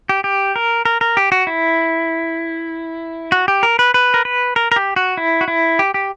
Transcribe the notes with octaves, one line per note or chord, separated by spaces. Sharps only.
G4
G4
A#4
A#4
A#4
G4
F#4
E4
F#4
G4
A#4
B4
B4
A#4
B4
A#4
A#4
G4
F#4
E4
F#4
E4
G4
G4